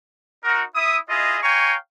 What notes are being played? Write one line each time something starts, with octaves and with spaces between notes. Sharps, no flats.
D#4 F#4 A#4
E4 E5 D#6
E4 F4 G#4 D#5
C#5 F5 G5 G#5 A#5 C#6